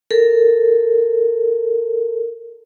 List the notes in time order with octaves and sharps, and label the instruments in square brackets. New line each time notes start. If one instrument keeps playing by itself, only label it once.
[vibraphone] A4 A#4